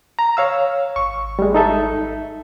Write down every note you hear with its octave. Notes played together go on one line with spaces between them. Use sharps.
A#5
C#5 F5 E6
G#1 C#6
G3 G#3
D#4 A4 E5